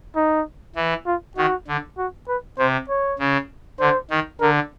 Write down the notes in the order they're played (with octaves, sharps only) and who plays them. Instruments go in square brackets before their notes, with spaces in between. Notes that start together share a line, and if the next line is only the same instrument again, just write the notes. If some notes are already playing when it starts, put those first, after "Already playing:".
[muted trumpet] D#4
[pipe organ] E3
[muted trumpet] F4
[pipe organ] D#3 [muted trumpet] F#4
[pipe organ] D3
[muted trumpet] F#4
B4
[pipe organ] C3 [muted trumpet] C5
[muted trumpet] C#5
[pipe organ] C#3
[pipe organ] D3 [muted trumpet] C5
[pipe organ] D#3
[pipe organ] D3 [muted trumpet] A#4